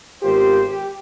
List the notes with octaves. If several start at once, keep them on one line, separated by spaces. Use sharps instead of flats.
G#1 B3 F4 G4 A#4 C5
G4